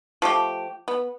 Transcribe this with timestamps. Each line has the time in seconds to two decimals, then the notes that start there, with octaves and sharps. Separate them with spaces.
0.22 F3 A3 G4
0.88 B3